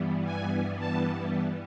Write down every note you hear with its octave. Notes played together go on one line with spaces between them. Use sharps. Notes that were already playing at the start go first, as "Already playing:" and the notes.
Already playing: G2 E3 G3 B3
G#5
A5